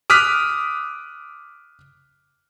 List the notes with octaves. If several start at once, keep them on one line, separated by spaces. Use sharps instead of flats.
D6 D#6 F6 F#6 B6